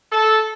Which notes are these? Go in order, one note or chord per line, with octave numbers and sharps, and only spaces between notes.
A4